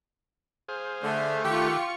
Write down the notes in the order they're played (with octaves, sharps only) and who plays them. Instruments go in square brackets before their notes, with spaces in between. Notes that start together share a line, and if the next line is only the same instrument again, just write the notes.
[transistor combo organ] G#4 C5 F5
[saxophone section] D3 [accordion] A3
[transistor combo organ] D#3 E5 F#5 [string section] F4 C#6 C#7 [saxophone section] G4